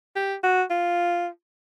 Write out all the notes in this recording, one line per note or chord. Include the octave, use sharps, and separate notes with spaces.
G4
F#4
F4